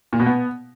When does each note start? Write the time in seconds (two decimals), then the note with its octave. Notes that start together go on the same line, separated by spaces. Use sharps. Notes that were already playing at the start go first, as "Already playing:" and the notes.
0.13 A#2
0.20 B2
0.26 B3